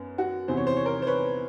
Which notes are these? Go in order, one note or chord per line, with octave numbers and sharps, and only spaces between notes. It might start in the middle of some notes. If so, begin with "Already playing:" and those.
Already playing: F#2 B3
F#4
E2 C3 E3 C5
C#5
C5
C#5
A#4 C5
C5
B4 C#5